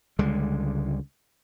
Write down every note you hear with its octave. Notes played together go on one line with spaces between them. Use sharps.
C#2 D3 G3 G#3